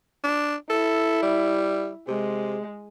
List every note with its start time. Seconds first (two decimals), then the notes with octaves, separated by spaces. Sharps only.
0.24 D4
0.70 E4 A4
1.23 G3
2.08 C3 G#3